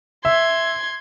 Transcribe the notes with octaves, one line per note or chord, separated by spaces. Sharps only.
E5 C6 G#6